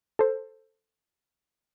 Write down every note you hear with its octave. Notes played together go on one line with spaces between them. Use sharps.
A4 C5